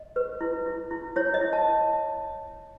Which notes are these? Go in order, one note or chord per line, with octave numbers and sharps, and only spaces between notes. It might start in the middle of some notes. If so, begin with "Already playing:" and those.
Already playing: D#5
B4
E4
E4
E4
E4 C#5
D#5
E4
A5